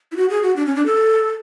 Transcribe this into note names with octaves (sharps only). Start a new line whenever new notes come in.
E4
F#4
G#4
F#4
D4
C#4
D4
A4